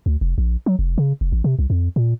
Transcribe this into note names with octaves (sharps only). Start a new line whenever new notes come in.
D2
F1
A#1
F#3
F1
C#3
F1
A1
C3
C2
F2
A#2